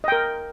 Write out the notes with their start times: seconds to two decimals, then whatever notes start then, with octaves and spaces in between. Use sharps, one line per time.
0.04 D#5
0.08 G5
0.12 A#4